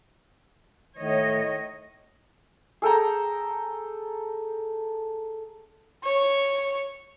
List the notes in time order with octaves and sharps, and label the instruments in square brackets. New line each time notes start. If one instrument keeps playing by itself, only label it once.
[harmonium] A2 [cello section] D#3 C#5 D#5
[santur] G#4 A4 G5 A#5
[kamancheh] C#5